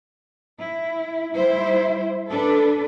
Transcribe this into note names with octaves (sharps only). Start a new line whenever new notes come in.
E4
G3 E4 C5
D4 A4 B4